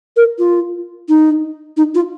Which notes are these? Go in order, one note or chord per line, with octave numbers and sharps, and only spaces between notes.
A#4
F4
D#4
D#4
F4